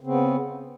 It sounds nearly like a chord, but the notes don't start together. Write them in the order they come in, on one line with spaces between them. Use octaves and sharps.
C#3 C4 B3